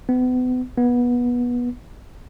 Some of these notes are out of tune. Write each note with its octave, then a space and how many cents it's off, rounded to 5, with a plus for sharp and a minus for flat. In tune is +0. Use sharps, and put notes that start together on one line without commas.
B3 +35
B3 -20